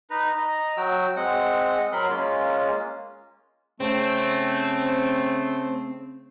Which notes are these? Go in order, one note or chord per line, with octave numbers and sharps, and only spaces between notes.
D#4 B4 A#5
D#5 A#5
F#3 F#4 G5 E6
G#3 C4 D#5 F#5
F#3 A#4 B5 C6
G#3 A#3 C#4 F4
C#3 A3 C4